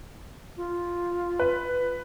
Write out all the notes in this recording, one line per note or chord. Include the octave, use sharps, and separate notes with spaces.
F4
B4